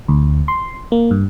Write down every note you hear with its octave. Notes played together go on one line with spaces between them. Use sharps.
D2
C6
A#3
G2